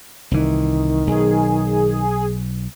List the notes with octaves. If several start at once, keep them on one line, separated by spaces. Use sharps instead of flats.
C2 D#3 E3
B1 G#4